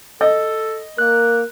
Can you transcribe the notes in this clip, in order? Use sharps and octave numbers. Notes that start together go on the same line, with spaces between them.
A4 D#5
A#3 A#4 F#6